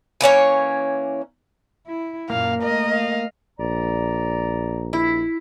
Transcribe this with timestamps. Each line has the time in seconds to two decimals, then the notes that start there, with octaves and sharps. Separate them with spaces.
0.21 E3 A#3 C#4 C#5
1.87 E4
2.30 F#2 A#2 A#3 F5
2.63 A3 A#4 D#5
2.95 F5
3.59 A#1 D5 A#5
4.93 E4